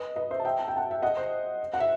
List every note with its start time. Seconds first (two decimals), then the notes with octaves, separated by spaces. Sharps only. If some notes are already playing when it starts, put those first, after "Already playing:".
Already playing: B4 D#5
0.16 B4 D#5
0.30 C5 E5
0.39 A5
0.45 E5 G5
0.59 A5
0.68 G5
0.76 F#5 A5
0.91 E5
1.02 D#5 F#5
1.17 C5
1.74 F#5
1.80 E5